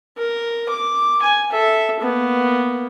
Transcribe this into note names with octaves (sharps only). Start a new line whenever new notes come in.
A#4
D6
G#5
A4 E5
A#3 B3